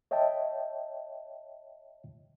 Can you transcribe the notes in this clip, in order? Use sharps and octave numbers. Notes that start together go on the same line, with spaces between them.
C#5 D#5 E5 G5 A5